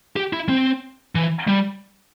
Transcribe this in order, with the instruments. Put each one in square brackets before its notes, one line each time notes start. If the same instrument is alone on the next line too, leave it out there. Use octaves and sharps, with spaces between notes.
[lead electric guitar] G4
E4
C4
E3
G3